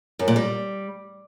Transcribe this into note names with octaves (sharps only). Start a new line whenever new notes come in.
F#2
A#2
G3